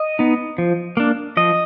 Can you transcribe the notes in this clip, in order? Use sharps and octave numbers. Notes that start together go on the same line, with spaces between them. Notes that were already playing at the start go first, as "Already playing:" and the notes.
Already playing: D#5
B3 D#4
F3
A#3 D4
F3 D#5